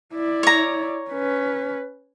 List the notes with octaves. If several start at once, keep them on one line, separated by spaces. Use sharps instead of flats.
E4 D5
C#5 A#5
C#4 B4